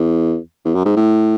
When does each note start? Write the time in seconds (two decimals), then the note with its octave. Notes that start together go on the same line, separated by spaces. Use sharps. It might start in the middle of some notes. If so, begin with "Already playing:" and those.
Already playing: E2
0.65 E2
0.75 F#2
0.85 G#2
0.97 A2